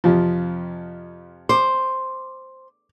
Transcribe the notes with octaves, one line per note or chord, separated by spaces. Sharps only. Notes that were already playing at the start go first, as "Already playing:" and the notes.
F2 C3 F3
C5 D6